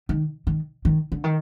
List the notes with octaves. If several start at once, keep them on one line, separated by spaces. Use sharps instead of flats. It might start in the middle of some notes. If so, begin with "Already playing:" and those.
D#3
D#3
D#3
D3
D#3